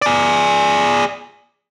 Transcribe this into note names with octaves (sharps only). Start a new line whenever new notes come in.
G#4 D5